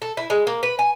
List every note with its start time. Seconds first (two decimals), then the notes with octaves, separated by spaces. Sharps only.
0.02 A4
0.17 E4
0.30 G#3
0.47 A#3
0.63 B4
0.79 G#5